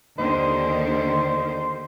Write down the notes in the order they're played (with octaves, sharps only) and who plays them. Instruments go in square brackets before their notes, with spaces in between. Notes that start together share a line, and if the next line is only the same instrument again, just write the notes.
[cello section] D#2 D3 D#3 [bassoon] D#4 [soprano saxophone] C5